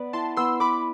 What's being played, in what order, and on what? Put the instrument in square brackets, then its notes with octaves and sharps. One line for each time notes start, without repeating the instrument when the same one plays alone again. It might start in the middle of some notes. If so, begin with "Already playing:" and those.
Already playing: [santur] B3 B4 D5
[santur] E4 [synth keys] A5 C6
[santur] B3 [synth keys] C6 E6
[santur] B4 [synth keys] B5 D6